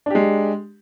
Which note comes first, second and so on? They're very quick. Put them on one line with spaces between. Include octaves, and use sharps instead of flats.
D4 G4 G#3